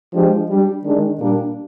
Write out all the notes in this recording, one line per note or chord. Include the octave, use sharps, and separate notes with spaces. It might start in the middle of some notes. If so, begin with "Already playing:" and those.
F3 G#3 D4 G4
G3 D4 G4
D#3 G#3 D4
A#2 G3 A#3 D4